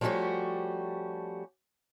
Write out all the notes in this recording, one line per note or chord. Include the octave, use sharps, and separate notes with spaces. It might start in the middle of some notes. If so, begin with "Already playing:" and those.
F3 G3 A3 C#4 F#4 G4